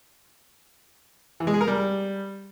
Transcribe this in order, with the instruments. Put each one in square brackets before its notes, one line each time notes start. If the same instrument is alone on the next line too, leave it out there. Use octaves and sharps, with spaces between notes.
[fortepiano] E3
G#3
G#4
A#4
G3